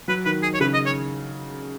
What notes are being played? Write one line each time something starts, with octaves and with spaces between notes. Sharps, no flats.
F#3 B4
D#3 B4
G#4
C#5
C#3 B4
D#5
C#5